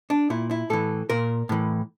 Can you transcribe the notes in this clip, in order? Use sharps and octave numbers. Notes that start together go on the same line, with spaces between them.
D4
A#2 E4
E4
A2 E3 A4
A#2 A#4
A2 E3